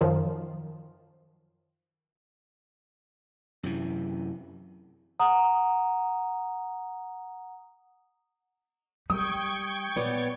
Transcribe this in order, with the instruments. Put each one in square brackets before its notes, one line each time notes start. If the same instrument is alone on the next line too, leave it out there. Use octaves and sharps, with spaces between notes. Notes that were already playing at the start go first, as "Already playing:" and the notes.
[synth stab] F#2 D#3 F3
[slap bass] F#2 C3 E3
[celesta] F#5 A#5 D#6
[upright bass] G3 [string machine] G5 C#6 G#6 [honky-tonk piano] D#6
[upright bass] A#2 [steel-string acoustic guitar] B3 C#5 D5